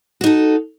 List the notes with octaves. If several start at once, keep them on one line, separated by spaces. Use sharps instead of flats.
D#4 F#4 A4